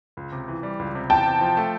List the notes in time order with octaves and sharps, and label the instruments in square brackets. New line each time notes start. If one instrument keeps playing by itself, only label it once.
[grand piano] C#2
C3
E3
G3
C#2
C3
[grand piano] E2 [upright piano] G5 A5
[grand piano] C3
F3
A3